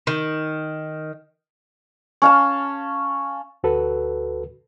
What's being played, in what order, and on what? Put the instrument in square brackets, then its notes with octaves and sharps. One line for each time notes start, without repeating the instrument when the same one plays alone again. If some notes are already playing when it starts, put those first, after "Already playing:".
[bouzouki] D#3
[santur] C#4 F5 A5
[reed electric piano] D2 F#4 A4 B4